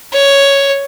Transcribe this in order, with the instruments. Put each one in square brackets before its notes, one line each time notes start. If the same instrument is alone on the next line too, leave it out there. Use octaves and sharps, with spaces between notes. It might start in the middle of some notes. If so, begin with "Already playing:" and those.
[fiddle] C#5